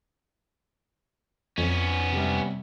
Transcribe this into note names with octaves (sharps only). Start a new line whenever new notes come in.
F2 B3 C#4
C3 G3